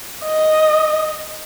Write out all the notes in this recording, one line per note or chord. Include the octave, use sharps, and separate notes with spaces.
D#5